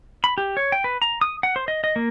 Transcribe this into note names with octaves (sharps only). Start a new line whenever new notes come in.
B5
G4
C#5
G5
B4
A#5
D#6
F#5
C5
D#5
D#5
A#3